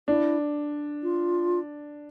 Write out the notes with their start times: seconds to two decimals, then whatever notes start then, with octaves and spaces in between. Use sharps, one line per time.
0.08 D4 E4
1.02 F4